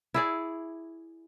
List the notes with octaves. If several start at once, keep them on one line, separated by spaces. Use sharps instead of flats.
E4 G#4 D5